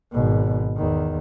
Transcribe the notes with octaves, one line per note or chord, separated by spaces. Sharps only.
G#1 B2
E2 D#3